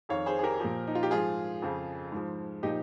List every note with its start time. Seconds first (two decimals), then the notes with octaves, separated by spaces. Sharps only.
0.09 F2 D#3 C#5 F5
0.26 G#4 C5
0.39 G#4
0.43 G4 A#4
0.60 A#2 F3
0.87 D#4
0.95 F4
1.03 G4
1.11 G#2 F3 F4 G#4
1.62 F2 C#3 F3
2.12 G#2 F3
2.63 A#2 F3 D#4 G4